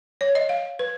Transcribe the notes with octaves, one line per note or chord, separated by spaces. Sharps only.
C#5
D#5
F5
B4